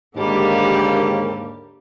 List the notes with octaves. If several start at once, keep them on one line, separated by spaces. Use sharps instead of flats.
D#2 G#2 D3 G3 A#3 G4